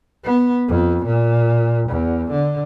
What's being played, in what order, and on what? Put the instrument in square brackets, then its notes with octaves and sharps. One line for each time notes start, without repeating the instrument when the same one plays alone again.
[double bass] B3
F2
A#2
E2
D3